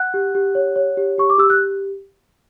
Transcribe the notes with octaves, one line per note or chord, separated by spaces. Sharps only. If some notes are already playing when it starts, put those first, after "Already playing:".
Already playing: F#5 F#6
G4
G4
C#5
C#5
G4
G4 C#6
D6
G4 E6
F#6